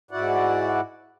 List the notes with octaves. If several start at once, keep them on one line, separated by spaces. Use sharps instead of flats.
G#2 E4 F#4 D5 F#5